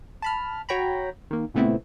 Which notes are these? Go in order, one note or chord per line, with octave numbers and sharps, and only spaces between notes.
A5 B5 F6
F#4 C#5 G5 A#5 B5
D#3 A#3
A#2 C#3 A3 B3 C4 E4